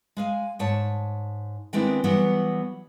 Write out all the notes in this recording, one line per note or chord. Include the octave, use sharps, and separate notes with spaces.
G#3 F5 G#5
G#2 C#5 A5
D#3 G#3 B3 C4 D4 E4
E3 F#3 G3 B3